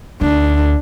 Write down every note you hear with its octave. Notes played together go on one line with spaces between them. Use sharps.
D2 D4